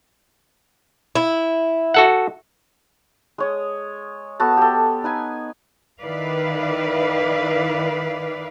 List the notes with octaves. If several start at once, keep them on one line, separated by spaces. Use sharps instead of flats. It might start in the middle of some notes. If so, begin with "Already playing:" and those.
E4
F#4 A4 F#5
G#3 C#5 D#6
B3 F#4 A4 A5
G4 A4
D#4 B4 G#5
D#3 E4 B4 D5 F5